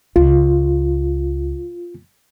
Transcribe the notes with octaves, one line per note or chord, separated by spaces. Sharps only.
C#2 F4